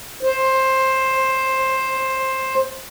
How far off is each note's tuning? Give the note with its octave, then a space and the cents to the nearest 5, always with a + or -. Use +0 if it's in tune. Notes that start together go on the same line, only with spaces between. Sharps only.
C5 +10